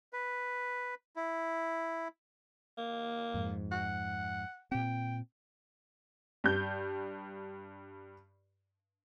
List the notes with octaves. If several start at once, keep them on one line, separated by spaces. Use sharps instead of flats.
B4
E4
A#3
F2 G#2
F#5
A#2 C4 G5
G2 G6